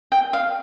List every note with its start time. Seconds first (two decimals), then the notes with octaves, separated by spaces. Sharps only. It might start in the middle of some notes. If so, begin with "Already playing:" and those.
0.12 G5
0.33 F5